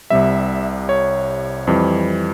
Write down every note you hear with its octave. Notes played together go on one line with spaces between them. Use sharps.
C2 C3 G3 E5
C#5
F2 E3 G3